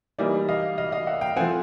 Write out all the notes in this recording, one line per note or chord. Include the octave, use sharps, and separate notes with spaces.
E3 G3 A#3 D#4 D5 E5
D#5 F5
D#5 F5
D#5 F5
E5 F#5
F5 G5
F3 A3 C4 F#5 G#5